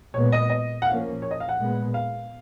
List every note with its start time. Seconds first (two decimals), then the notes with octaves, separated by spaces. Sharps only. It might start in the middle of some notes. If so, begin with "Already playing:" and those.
0.14 A#2 G#3 B3 C#5
0.32 D#5
0.50 D#5
0.82 F#5
0.86 A#2 F3 A#3 C#4 F5
1.22 C#5
1.31 D#5
1.40 F5
1.49 F#5
1.58 A#2 G#3 B3
1.94 F5